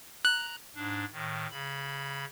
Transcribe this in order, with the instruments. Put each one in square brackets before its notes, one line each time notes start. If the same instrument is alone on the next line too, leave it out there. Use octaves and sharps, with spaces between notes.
[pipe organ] A#5 [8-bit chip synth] F#6
[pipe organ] G#2 D4
A2 D#3
C#3 B5